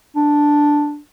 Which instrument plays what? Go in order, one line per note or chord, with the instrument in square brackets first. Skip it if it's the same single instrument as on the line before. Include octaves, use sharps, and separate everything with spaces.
[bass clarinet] D4